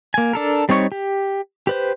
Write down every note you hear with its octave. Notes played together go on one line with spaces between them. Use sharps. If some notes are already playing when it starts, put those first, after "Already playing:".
A#3 G#5
D4 A4 A#4
G3 C4 D#4 C#5 C#6
G4
G4 B4 C5